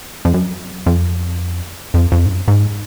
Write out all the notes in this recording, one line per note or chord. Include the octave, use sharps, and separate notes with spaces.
F2
F#2
F2
F2
F2
G#2
F#2
G#2